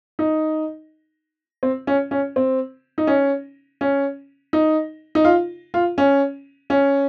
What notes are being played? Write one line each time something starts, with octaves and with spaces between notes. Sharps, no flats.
D#4
C4
C#4
C#4
C4
D#4
C#4
C#4
D#4
D#4
F4
F4
C#4
C#4